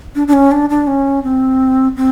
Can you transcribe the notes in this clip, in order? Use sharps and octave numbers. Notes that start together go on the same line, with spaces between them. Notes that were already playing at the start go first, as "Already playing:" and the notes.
D4
D4
C#4
D4
D4
C#4
C4
C4